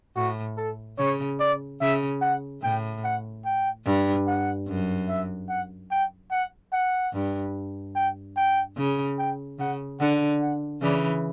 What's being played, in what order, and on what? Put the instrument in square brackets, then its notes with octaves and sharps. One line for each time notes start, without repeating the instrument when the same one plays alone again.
[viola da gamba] A2 [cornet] F#4
[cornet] A4
[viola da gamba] C#3 [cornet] C#5
[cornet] D5
[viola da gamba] C#3 [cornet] E5
[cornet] F#5
[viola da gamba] A2 [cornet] G5
[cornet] F#5
G5
[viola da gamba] G2
[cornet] F#5
[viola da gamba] F#2
[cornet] E5
F#5
G5
F#5
F#5
[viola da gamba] G2
[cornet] G5
G5
[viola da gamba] C#3
[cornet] G5
[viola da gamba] C#3 [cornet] F#5
[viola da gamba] D3 [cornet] F#5
[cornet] F#5
[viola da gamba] C#3 E3 [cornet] D5